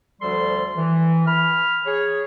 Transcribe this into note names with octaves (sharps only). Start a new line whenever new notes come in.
D2 F3 G3 A4 C6
E3
B5 F6
G#4 C#5